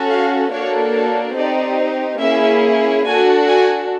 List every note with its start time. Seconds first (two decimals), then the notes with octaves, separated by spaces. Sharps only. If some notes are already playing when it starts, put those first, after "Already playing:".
Already playing: C#4 F#4 A4
0.10 F5
0.51 A#3 D4 F#4 A4 C#5
0.94 C#5
1.36 C4 D#4 G4 D5
2.21 A#3 C#4 E4 G#4 E5
3.06 D4 F#4 A4 G#5
3.48 G#5